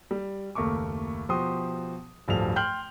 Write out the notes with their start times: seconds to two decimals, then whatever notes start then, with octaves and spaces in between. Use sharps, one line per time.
0.11 G3
0.55 F#1 D#2 A3 A#4 C#6 D6
1.29 B2 F3 F#4 G4 C6 D#6
2.28 D1 G2 F3 A4 F7
2.56 G5 C6 F6 G6 F#7